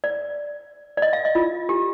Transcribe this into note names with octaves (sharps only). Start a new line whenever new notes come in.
D5
D5
D#5
F5
D#5
F4
G4